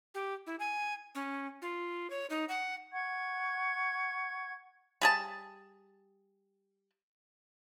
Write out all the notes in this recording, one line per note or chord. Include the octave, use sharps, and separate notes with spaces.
G4
E4
G#5
C#4
F4
C#5
D#4
F#5
F#5 C#6 G#6
G3 G#4 A5